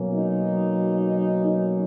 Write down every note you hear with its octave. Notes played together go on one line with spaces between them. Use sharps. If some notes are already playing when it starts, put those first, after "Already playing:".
Already playing: B2 F#3 A#3 C#4
D#4
D#4